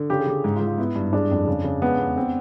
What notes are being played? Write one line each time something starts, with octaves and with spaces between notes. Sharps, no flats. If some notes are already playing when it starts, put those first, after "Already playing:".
Already playing: D3
C#3 G4
G#4
C#3 G4
G#2
F4
G#2
F4
B3 E4
G2
G#3 D4
F2
C#3
C#3
G#3 B3
E2
C4